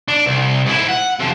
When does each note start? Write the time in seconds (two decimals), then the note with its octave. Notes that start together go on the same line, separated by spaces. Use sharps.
0.08 D4 D5
0.26 C2
0.66 G#2 E4
0.89 F#5
1.19 C3 F3